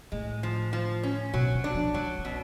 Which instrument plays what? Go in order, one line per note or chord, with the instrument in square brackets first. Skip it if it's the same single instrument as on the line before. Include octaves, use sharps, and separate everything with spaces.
[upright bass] A2 [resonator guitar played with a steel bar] G#3
[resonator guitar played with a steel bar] F3
F3
C#4
[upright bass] B2 [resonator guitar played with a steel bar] F#3
[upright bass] D3
[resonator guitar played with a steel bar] D4
[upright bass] F3
[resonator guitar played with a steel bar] F#3 [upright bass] G#3
[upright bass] D4
[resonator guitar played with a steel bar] B2 [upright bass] C#4